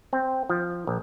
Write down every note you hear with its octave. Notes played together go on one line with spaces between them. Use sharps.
C4
F3
A#1